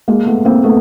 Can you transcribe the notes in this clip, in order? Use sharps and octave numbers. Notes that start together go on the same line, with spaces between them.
G#3 A#3
A3 B3
A#3 C4
A3 B3